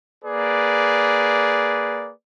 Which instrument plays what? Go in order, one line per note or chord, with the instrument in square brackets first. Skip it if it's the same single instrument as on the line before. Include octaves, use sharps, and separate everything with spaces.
[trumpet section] A#3 G#4 B4 D5